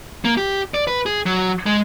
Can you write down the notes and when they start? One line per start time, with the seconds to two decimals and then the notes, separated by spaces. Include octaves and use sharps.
0.25 A#3
0.37 G4
0.74 D5
0.87 B4
1.06 G#4
1.26 F#3
1.66 G#3